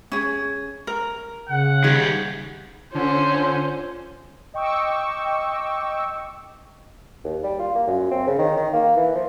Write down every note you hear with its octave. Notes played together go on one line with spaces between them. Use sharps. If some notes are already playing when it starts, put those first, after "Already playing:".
C#4 G#4
A#4
C#3 F#5
D#3 G3 G#4
D3 C#4 F4 C5
D#5 G5 C#6 D6 E6
D#2
G3
F4
A#3
F#2
C4
C#3
D#3
D#3
A#3
E3
F3